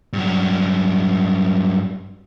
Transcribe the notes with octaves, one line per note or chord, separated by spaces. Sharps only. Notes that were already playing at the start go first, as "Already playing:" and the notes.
G2 F#3